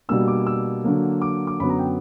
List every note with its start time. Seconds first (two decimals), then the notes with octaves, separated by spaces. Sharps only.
0.09 B2 G3 A#3 D4 E6
0.28 D6
0.47 E6
0.84 D3 F#3 A#3
1.22 D6
1.47 D6
1.60 F#2 D3 F#3 B3 B5
1.69 A#5
1.79 G5